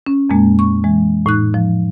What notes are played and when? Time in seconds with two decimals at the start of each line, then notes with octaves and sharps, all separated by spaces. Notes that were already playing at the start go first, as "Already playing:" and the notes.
0.06 C#4
0.30 F2 A#2 G#3 A#3
0.59 C#6
0.84 E3 G#3
1.26 A2 D#4 F#6
1.54 F3